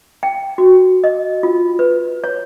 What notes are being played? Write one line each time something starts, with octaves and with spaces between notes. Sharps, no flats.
G5
F#4
D#5
F4
B4
C#5